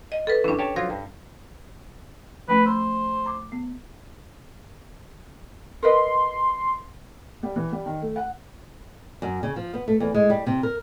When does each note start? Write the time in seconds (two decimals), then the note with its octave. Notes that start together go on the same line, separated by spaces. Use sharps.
0.12 D#5
0.27 A4 B4
0.44 G2 E3 C#4 D4
0.59 G4 C#5 A5
0.76 F3 F#3 F4 A#6
0.90 G2
2.48 F3 A3 C#4 B4
2.66 C5 A#5 B5 E6
3.26 A#5 D6
3.52 B3
5.83 A#4 B4 D#5 C6
7.43 G3
7.56 E3
7.72 G3
7.86 D#3
8.02 A3
8.16 F#5
9.22 F#2
9.43 C#3
9.56 F3
9.74 B3
9.88 A3
10.00 E2
10.14 G#3
10.30 G3
10.47 C3
10.63 A#4